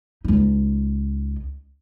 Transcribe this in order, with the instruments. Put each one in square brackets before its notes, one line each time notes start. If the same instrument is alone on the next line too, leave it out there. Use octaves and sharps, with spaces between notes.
[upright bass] C#2 D#4